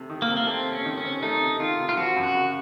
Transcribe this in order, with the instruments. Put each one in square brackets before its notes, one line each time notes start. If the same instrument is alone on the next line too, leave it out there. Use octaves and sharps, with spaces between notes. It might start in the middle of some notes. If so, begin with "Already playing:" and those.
Already playing: [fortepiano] C3 A3
D#3
[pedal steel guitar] A#3
[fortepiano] C3
[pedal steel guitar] A#3
[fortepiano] A3 [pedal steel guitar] C4
[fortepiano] C3
[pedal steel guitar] C#4
[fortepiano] D#3
[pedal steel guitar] C#4
[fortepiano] C3
[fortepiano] A3 [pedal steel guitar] D#4
[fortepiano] C3
[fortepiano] D#3 [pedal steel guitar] F4
[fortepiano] C3
[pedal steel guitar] F4
[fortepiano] F3 [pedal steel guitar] F#4
[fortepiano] F#2
[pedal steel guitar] F#4
[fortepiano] C#3